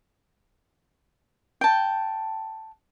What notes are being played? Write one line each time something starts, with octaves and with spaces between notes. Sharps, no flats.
G5 A5